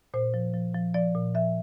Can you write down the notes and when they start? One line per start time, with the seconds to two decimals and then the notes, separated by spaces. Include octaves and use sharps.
0.14 A#2 C5
0.34 F3
0.54 F3
0.74 F3
0.94 F3 D5
1.15 A#2
1.34 F3 E5